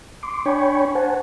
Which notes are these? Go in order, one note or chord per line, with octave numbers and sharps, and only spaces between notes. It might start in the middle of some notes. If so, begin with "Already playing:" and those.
C6 D6
D4 C#5 G5 G#5 B5 C#6
C5 F#5 G#5 A5